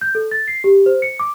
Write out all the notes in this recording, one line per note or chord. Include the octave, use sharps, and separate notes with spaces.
G6
A4
A6
C7
G4
C5
C#7
D6